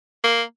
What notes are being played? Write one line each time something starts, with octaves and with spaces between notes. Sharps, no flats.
A#3